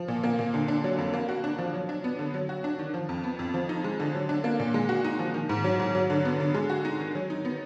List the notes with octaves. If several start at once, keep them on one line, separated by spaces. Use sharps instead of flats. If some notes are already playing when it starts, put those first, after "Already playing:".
Already playing: F3
A#2
A#3
A#2
D3
D4
F#3
F2
A#3
F#4
D4
F3
F#3
D4
B3
D3
F#3
F#4
D4
D#3
F3
F2
B3
F2
F3
D#4
G#3
D3
F#3
D4
A#3
A#2
G#3
F#4
D#4
F3
D#3
G#2
F#3
G#2
F#3
D3
B3
D3
G#3
F#4
D#4
D#3
F#3
D#4
B3